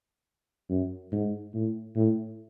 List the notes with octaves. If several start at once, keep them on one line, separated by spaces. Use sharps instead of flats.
F#2
G#2
A2
A2